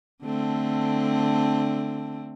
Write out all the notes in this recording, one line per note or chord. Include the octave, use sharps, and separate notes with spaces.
D3 A3 C4